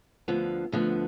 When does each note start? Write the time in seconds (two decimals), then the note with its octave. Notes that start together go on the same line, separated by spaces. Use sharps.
0.28 D2 D3 F3 B3
0.72 D2 D3 F3 B3